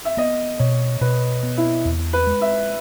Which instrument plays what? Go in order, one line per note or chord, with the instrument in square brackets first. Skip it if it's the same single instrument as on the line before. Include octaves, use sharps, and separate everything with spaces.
[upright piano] E5
[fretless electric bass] B3 [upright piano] D#5
[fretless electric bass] B2 [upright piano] C#5
[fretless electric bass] B2 [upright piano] B4
[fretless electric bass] B3
[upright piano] E4
[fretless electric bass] E2
[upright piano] B4
[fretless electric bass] G#3
[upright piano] E5